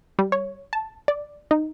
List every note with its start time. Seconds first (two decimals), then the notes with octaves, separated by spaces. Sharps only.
0.19 G3
0.32 C#5
0.73 A5
1.08 D5
1.51 D#4